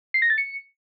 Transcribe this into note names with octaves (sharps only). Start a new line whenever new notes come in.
C7
A#6
A6
C#7